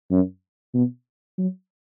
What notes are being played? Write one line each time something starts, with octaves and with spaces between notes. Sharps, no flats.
F#2
B2
F#3